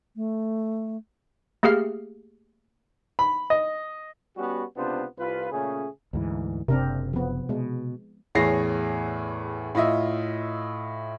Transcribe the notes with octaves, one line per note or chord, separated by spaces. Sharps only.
A3
A3 A#3 G4 G#4 F5 F6
B5
D#5
G3 B3 C#4 F#4
C#2 C3 B3 D4 F4 C5
C2 F4 B4
A#2 C#3 A3 C#4 G#4
D2 G#2 E3
F#1 C3 C4 D4 A#4
F3 B3
B2 G#3
E2 A2 G#4 C#5 A#6 C7
A2 F4 D#5 E5